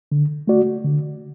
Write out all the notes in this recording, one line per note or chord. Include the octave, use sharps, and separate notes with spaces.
D3
A3 F#4 D5
D3